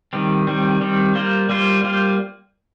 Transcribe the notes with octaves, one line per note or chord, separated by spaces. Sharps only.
D#3 G3 C4
D#3 G3 C4
D#3 G3 C4
G3 A#3 F4 C5
G3 A#3 F4 C5
G3 A#3 F4 C5